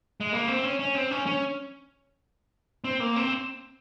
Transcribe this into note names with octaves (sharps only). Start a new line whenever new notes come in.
G#3
A#3
C4
C#4
C#4
C4
C#4
C#4
C4
A#3
C4